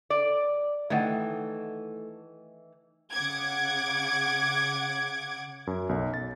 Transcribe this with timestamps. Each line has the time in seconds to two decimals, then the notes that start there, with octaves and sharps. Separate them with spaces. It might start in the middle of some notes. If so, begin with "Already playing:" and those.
0.10 D5
0.90 D#3 E3 A3 F#5
3.13 C#3 F#5 D6 G#6
5.67 F#2
5.89 B1
6.14 A6